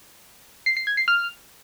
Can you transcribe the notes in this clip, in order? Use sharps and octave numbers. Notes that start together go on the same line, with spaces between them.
C7
C7
G#6
C7
F6